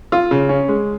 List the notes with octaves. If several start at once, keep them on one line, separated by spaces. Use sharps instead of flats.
F4
C#3
C#4
G#3